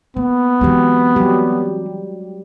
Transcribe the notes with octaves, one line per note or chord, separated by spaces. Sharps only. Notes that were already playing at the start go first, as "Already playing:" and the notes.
A#3 B3
E3 F#3 G#3 C4 G4
F#3 G3 G4